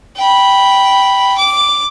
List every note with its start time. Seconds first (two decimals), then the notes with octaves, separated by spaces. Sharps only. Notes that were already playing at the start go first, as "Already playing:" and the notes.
0.17 G5 B5
1.38 D6